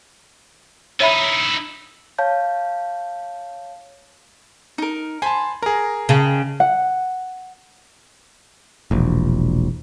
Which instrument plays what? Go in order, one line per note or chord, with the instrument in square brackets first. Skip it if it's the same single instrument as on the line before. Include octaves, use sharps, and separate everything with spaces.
[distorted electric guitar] D#4 E4 [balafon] C#5 E5 B5
[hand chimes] C#5 F5 A5 G6
[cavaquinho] D#4 A#4
[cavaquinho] C5 B5 C6 [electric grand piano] G#5 A5
[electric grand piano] G#4 A#4 [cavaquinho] A#5
[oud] C#3 [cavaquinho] D#5 G5 A5
[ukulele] F#5
[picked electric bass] E1 A#1